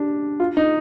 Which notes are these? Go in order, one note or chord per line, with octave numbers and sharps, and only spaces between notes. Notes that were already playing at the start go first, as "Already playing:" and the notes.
Already playing: D4 G4
F4
D#4